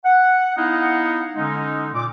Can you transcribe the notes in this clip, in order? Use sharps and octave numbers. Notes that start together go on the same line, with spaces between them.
F#5
B3 D#4 E4 D#5 F5 F#5
D3 G#3 C#4 D#4
A#2 D6